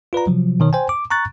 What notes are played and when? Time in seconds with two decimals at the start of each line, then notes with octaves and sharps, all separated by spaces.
0.13 F4 B4 D5 A#5
0.27 C3 F3 F#3
0.60 B2 D#3 C#5
0.73 C5 G5 G#5
0.89 D6
1.10 A#5 C#6 F#6 A6